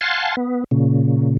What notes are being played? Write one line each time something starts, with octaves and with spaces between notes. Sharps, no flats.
F5 F#5 G#5 A5 C6
B3
A#2 C#3